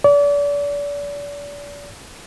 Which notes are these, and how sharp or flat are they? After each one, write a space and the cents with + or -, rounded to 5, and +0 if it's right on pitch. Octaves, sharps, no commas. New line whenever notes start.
D5 -35